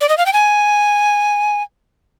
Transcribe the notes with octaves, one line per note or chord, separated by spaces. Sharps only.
D5
D#5
F5
G5
G#5